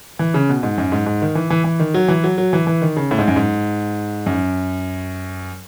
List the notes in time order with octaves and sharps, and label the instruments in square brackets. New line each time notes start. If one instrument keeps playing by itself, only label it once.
[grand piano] E3
C#3
B2
G#2
F#2
G#2
G#2
D#3
E3
E3
E3
D#3
F#3
E3
F#3
F#3
E3
E3
D#3
C#3
A2
G#2
F#2
G#2
F#2